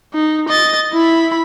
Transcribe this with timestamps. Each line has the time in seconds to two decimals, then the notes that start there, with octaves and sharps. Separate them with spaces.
0.14 D#4
0.49 D#5 A6
0.93 E4 B5